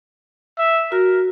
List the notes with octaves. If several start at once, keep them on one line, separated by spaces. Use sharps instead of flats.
E5
F#4 A#4